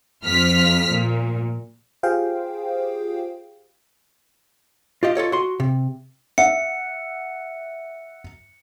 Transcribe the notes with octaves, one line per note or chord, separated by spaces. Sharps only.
F2 F3 F6 B6
A#2
F4 G4 G#4 C5 F5 G5
F4 G4 D#5 F5
F4 A4 C#5 D#5
F#4 C6
C3
E5 F#5 C#7